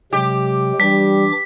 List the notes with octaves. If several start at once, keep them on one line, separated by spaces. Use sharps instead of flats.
C3 F#3 G#3 G4
E3 G3 D4 D6 B6